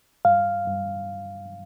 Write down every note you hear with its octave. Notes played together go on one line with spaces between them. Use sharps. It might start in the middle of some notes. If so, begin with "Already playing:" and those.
G2 F5
G2